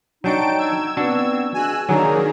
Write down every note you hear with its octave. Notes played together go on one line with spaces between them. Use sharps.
F#3 D4 D#4 F#4 G5 A5 D7
E6 G#6
B3 C4 D4 F#4 A5
G#3 D4 F#4 G#5 E6 F#6
D#3 F#3 A#3 D4 G#4 A#5